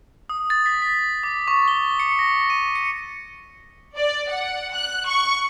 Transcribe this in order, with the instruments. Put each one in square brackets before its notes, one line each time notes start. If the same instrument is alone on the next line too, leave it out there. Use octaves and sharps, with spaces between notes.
[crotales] D#6
A6
B6
B6
D6
C#6
G7
C#7
A#6
D#7
C#7
[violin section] D5
F#5
F#6
C#6